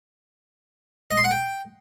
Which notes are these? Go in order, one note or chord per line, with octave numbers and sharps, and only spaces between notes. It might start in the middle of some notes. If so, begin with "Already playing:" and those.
D#5
C6
F#5
G5